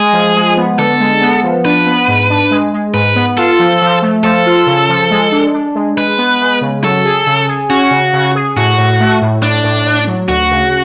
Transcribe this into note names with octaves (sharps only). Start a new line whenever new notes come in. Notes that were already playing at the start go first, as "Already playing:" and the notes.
Already playing: G#3 G#4
F3
G#3
B3
D3 A4
G#3
B3
F3
D4 B4
B3
G#2
D4
G#3
G#3
G#2 B4
B3
F4 A4
F3
F3
A3
F3 A4
F4
C#3
F3
G#3
D4
D4
G#3
G#3 B4
B3
G#3
C#3
F#3 A4
G#4
C#3
G#4
C#4 F#4
C#3
C#3
G#4
A2 F#4
A2
A3
A2
A2 D4
A2
A2
F#3
D2 F#4
C#3